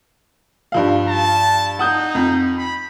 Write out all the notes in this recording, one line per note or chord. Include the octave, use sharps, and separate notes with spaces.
G2 F3 F5
A5
D#4 F#5 D#6 G6
F2
B5